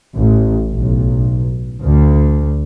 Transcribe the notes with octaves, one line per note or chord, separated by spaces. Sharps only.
A1
B1
D2